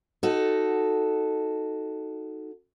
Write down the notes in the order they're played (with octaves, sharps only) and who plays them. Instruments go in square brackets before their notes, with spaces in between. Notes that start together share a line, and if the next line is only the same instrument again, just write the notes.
[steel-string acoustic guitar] D#4 F#4 A4